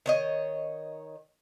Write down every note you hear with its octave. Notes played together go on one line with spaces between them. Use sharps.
D#3 C#5 D#5